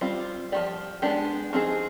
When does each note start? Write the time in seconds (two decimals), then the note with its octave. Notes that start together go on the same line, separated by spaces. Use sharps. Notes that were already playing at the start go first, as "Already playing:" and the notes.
0.01 G3 C4 F4
0.52 F3 C4 G4 D5
1.02 G#3 B3 D4 G4
1.53 F3 C4 D#4 G#4